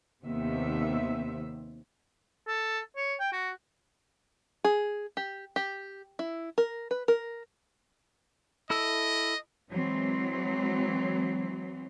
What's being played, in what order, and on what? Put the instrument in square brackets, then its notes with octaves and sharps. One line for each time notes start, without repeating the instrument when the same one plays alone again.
[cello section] D#2 C3 D#3 B3 C4 E5
[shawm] A4
C#5
G5
F#4
[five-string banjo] G#4
G4
G4
E4
A#4
B4
A#4
[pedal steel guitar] E4 A4 E6 [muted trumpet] D#5
[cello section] E3 F#3 G#3 C4